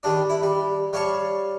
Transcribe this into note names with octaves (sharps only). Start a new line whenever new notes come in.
D#3 G3 D4 D5
E4
G3
G3 C#5 F5 A5 C#6